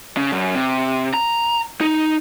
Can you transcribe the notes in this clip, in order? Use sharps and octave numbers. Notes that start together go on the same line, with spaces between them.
C#3
F#2
C3
A#5
D#4